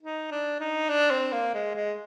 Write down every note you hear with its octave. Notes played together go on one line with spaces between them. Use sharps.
D#4
D4
D#4
D4
C4
A#3
G#3
G#3